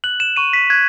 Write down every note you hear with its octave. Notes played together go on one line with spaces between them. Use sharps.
F#6 F#7
E7
C#6 D#7
B6
F#6 G#6